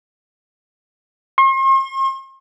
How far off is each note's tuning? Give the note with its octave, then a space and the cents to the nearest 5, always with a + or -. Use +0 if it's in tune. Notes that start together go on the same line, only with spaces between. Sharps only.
C6 +45